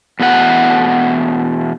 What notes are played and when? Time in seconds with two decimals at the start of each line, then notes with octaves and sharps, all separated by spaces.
0.20 E2 B2 A3 D#4 F#5